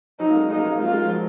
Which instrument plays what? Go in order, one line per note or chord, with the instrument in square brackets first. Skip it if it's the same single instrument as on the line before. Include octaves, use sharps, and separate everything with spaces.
[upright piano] F#3 [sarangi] D#4
[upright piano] A#3
G#3
[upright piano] G#3 [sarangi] D#4
[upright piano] A#3
G#3
A#3
G#3
[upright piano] A#3 [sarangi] F4
[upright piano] G#3
F3
F#3